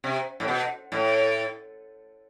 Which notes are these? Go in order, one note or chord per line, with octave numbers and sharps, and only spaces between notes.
C3
A2
B2
A2